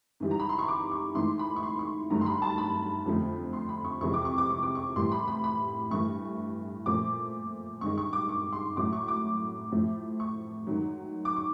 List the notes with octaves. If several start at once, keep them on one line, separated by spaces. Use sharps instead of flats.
G#2 E3 G3
A#5
B5
C6
C#6
D6
C#6
G#2 E3 A3 C6
B5
C#6
C6
C#6
G2 D#3 F#3 A3 A#5
C6
B5
A5
B5
F2 D3 F3 A3
C6
B5
C#6
F2 C3 E3 G#3 C#6
D6
C#6
D6
C#6
D6
C#6
A2 E3 G3 C6
B5
B5
B5
G2 E3 A3 C#6
A#2 F3 A3 D6
G2 D#3 G#3 C#6
C#6
D6
C#6
C6
A2 F#3 A3 D6
C#6
D6
A2 F3 A3
C#6
G#2 D#3 F#3
D6
C#6